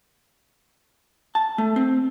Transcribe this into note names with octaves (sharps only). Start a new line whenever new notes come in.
A5
A3
C4